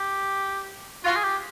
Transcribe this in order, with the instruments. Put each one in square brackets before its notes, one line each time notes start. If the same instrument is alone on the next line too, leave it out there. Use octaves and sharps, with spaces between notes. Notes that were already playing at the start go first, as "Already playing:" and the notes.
Already playing: [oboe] G4
[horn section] F4 [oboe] F#4
[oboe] G#4
G4